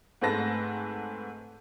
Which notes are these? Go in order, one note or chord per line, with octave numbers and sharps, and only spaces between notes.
G#2 A3 C4 B4 A5 A#6